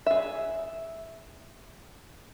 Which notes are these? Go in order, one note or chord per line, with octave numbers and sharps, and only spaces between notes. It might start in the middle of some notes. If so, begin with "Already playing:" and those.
G#4 E5